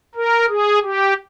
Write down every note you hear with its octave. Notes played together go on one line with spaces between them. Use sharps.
A#4
G#4
G4